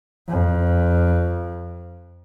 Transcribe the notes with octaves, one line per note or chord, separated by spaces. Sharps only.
F2